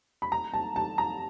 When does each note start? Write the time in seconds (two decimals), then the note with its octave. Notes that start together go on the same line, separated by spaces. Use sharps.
0.22 B5
0.32 A#5
0.53 A5
0.76 A5
0.98 A#5